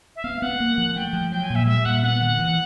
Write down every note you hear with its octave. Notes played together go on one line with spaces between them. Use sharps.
E5
B3 F5
B3 F#5
A#3
F3
A3 G5
F3
F#3 G5
G#5
A#2
E5
G3 E5
A#2 F#5
B3 F#5
D#3
E3